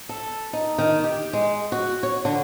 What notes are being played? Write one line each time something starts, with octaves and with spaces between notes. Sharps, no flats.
A4
D#4
D#3
G4
G#3
F#4
C#5
D3